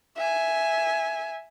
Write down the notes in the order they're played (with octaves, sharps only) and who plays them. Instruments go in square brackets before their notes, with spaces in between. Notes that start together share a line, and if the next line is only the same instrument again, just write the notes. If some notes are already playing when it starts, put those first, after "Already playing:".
[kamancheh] E5 G#5